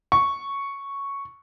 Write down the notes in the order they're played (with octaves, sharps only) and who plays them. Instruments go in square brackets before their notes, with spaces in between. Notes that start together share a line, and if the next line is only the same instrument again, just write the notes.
[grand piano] C#6